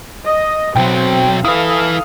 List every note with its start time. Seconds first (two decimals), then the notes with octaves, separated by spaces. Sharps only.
0.25 D#5
0.76 B1 F#3 C4 G5
1.45 E4 A4 B4 F5 D#6